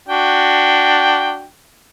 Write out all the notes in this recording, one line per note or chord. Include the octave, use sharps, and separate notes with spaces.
D4 F#4 G5